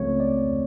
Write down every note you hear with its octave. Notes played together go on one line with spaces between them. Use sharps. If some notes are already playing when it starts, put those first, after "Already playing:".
Already playing: C#2 C#3 F3 A3 C4 C#5
D5